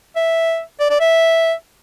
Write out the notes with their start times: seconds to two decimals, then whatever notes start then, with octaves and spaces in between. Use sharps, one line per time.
0.16 E5
0.80 D5
0.91 D5
1.01 E5